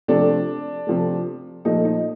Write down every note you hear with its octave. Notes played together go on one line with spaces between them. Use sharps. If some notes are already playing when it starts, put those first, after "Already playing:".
C3 F3 A3 D4
C3 F3 A3
A#2 F3 A3 D#4
D#4